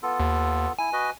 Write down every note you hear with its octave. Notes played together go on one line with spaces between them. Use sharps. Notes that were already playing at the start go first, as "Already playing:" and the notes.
B3 F4 A4
D#2
E4 G#5
F#4 B4 D#5